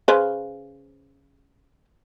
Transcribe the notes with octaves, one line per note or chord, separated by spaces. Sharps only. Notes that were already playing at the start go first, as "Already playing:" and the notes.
C#3 B4 C5